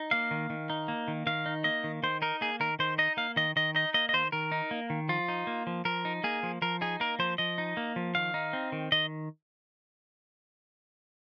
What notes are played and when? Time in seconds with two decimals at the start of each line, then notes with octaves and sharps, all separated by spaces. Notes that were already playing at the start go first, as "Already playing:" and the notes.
Already playing: D#4
0.11 A#3 F5
0.31 D#3
0.50 D#3
0.70 D#4
0.88 A#3
1.08 D#3
1.27 D#3 F5
1.46 D#4
1.64 A#3 D#5
1.84 D#3
2.03 D#3 C5
2.22 D#4 A#4
2.41 A#3 G#4
2.60 D#3 A#4
2.79 D#3 C5
2.98 D#4 D#5
3.17 A#3 F5
3.36 D#3 D#5
3.56 D#3 D#5
3.75 D#4 D#5
3.94 A#3 D#5
4.09 D#5
4.13 D#3 C5
4.32 D#3 A#4
4.52 D#4
4.71 A#3
4.90 D#3
5.09 F3 F4
5.28 D#4
5.47 A#3
5.67 F3
5.85 F3 A#4
6.05 D#4
6.24 A#3 G#4
6.43 F3
6.62 F3 A#4
6.81 D#4 G#4
7.00 A#3 A#4
7.19 F3 C5
7.38 F3 D#5
7.58 D#4
7.77 A#3
7.96 F3
8.15 D#3 F5
8.34 D#4
8.53 C4
8.72 D#3
8.92 D#3 D#5